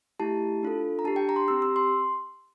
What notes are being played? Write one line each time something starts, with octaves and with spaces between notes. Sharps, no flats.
A3 E4 G4 A5
D4 F4 A4
A#5
D4 G4 A5
G5
A#5
C6
C4 G4 E6
E6
C6